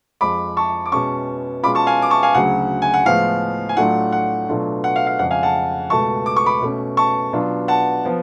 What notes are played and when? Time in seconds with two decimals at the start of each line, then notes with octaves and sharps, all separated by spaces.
0.21 F2 F3 G#3 B5 D6
0.57 A5 C#6
0.86 D6
0.92 B2 G#3 C#4 A5 C#6
1.63 B2 G#3 C#4 F4 B5 D6
1.75 A5 C#6
1.87 F5 G#5
2.02 D6
2.10 A5 C#6
2.23 F5 G#5
2.34 D2 C#3 F#3 F#5
2.82 G#5
2.94 F#5
3.06 A2 F3 G#3 B3 F5
3.69 G#5
3.77 A2 F#3 A3 D4 F4 F#5
4.12 F#5
4.49 B2 F#3 A3 D4 F4
4.84 F#5
4.96 F5
5.07 F5
5.19 F2 C#3 G#3 F#5
5.31 F5 G#5
5.43 F#5 A5
5.90 C#2 B2 A3 A5 C#6
6.26 D6
6.36 C#6
6.46 B5 D6
6.62 B2 A3 C#4
6.97 A5 C#6
7.33 B2 F#3 B3 D4 F4
7.68 F#5 A5
8.05 F3 B3